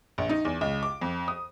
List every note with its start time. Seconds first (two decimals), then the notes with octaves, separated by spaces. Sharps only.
0.18 A#1
0.29 D#4
0.45 E2
0.61 C#2
0.83 D6
1.02 F2
1.28 D#6